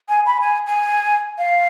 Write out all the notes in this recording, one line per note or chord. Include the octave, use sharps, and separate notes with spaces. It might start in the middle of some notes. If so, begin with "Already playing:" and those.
G#5
B5
G#5
G#5
F5